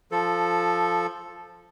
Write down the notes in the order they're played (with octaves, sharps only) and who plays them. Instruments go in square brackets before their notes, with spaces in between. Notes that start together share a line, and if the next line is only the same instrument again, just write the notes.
[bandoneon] F3 A4